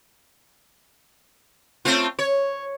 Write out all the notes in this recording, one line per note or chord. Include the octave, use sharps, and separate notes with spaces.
A3 C4 F4
C#5